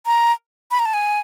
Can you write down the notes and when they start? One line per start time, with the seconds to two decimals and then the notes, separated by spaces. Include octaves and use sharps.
0.06 A#5
0.71 B5
0.79 A#5
0.86 A5
0.94 G#5